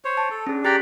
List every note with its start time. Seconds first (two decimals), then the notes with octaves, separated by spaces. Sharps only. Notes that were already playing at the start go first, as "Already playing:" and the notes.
0.05 C5 C#5
0.17 A5
0.31 A4
0.47 C#4 D4 G#4
0.65 G4 D5 G5 A#5 F#6 B6